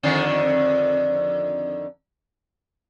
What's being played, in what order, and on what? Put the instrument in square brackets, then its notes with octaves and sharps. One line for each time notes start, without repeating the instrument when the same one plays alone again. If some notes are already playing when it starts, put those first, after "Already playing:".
[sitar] F2 D3 D#3